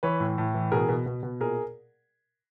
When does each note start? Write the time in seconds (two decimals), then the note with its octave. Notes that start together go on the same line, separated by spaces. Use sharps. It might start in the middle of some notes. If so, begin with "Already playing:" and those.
0.03 E3 B4 C#5
0.20 A2
0.38 A2
0.54 E3
0.72 B2 G#4 A#4
0.89 B2
1.06 B2
1.23 B2
1.40 A#2 G#4 A#4